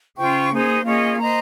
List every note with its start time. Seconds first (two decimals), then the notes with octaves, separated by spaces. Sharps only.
0.17 C#3 F4 C5 G5 C#6
0.51 A#3 D#4 G#4 C5
0.85 A#3 C#4 F4 G#4 D#5
1.18 C5 D#5 A#5